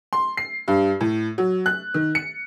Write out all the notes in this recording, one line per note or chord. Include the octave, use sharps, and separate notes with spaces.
C6
C7
G2
A2
F#3
F#6
D#3
C#7